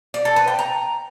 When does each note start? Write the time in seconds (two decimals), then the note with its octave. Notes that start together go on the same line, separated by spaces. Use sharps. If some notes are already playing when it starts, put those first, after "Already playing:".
0.14 D5
0.25 A4
0.36 B4
0.47 G5
0.59 A#5